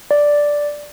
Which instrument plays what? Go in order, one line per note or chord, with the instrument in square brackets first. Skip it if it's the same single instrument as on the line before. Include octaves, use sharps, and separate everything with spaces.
[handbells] D5